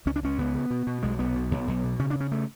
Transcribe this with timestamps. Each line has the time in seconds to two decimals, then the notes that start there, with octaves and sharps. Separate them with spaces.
0.06 C#2 C#4
0.16 D4
0.23 C#2 C#4
0.38 C#2 B3
0.54 C#3
0.70 B2
0.87 B2
1.03 B1 G#3
1.19 B1 B3
1.35 B2
1.51 B1
1.67 B1
1.84 B2
1.99 C#3 C#4
2.10 D4
2.15 C#3
2.20 C#4
2.32 A3